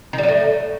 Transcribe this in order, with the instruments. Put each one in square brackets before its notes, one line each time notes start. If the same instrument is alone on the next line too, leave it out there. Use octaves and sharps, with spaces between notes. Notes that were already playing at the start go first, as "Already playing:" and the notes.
[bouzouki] D#3
G3
F#3
A2